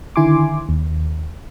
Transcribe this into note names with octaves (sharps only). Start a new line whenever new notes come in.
D3 D#3 E4 G#5 C6 D6
D#2